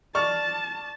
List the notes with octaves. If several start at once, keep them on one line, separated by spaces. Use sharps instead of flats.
D5 A5 C#6 F6